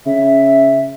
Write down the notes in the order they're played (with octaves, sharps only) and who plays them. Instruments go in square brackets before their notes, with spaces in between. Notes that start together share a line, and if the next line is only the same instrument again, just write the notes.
[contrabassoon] C#3 [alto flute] E5